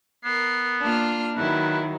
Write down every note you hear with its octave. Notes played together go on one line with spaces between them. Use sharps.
B3 A#4 C7
A#3 D4 F4 F6
D#3 F#3 E4 B4